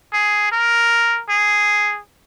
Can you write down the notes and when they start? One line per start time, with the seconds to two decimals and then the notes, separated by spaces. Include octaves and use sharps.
0.13 G#4
0.52 A#4
1.29 G#4